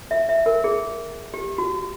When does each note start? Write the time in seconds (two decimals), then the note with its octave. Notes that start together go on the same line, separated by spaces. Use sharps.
0.11 E5
0.29 E5
0.46 A#4
0.64 G#4
1.34 G4
1.58 F#4